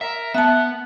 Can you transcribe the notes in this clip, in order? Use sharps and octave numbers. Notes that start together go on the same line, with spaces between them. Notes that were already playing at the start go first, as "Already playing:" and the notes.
A#4 E5
B3 E5 F#5 A5